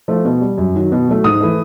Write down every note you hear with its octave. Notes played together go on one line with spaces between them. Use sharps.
F3 A3
B2
G3
F#2
D#3 F#3
B2
F#3 A3
G#2 D#6
E3 A3